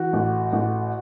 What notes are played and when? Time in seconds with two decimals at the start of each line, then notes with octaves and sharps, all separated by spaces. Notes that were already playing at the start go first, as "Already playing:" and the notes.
Already playing: E3 F#4
0.13 A1
0.53 A1